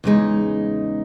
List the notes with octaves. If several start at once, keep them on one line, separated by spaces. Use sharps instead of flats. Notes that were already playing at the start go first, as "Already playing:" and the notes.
E2 C#3 G#3 D#4